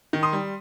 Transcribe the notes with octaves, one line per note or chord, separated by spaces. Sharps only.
D#3
C6 D#6
G3